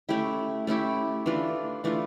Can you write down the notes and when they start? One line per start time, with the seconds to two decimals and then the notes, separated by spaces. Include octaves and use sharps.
0.09 A3 C#4 E4 G4
0.67 A3 C#4 E4 G4
1.26 E3 A3 D4 F4
1.84 E3 A3 D4 F4